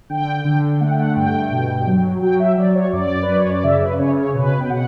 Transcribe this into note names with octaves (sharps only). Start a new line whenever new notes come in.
D3 G5
D3
A3 F#5
G5
F#5
G2 G5
B2
F#3
F#3 G5
E5
F#3 D5
C#5
F#2 D5
B4
F#2
C#5
D5
C#3 E5
B4
C#3 C#5
C#5
B2 B4
G5
B2 F#5